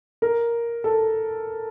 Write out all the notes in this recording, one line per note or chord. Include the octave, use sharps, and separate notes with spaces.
A#4
A4